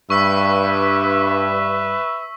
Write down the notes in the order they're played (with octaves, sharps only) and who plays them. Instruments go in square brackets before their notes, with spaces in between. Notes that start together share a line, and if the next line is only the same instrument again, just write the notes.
[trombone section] G2 [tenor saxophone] B4 [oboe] E5 [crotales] C#6 E6 B6